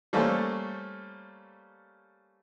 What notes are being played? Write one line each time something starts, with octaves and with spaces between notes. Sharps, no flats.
G3 A3 A#3 C#4 A4 C5